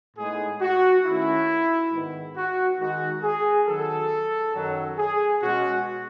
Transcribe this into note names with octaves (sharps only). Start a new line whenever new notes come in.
A2 G#3 B3 D#4 G#4
F#4
D#3 A3 C#4 E4
G#2 D#3 G#3 B3
F#4
D#3 G#3 D#4 F#4
G#4
D#3 F#3 B3 A4
F#2 D#3 F#3
G#4
B2 G#3 C#4 F#4